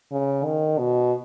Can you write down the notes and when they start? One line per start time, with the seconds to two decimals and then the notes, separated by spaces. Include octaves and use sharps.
0.12 C#3
0.45 D#3
0.79 B2